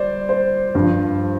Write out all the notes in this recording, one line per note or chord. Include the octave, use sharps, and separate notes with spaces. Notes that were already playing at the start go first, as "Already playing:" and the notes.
Already playing: G3 C5 D5
C5
G2 F3